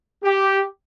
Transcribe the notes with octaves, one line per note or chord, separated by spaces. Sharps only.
G4